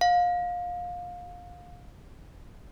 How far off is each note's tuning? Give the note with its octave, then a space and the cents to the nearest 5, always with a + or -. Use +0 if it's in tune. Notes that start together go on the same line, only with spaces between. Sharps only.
F5 +25